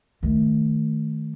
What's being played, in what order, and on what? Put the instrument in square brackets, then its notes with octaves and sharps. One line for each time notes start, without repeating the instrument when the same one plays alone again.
[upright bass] D#3 A3